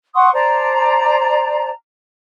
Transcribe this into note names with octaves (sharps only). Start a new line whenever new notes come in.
F#5 C6 C#6 D#6
C5 D5 A5 A#5